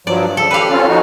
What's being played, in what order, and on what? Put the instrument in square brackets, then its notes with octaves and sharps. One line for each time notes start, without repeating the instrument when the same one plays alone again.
[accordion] G2 F3 F#3 [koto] D5
[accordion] C#3 F3 [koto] A4
[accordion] G4 [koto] B4 F5
[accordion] C4 C#4 F4
F3 D#4 F#4